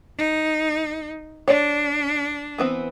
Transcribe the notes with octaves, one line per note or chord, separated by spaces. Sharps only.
D#4
D4 C#5 D5
E3 B3 C4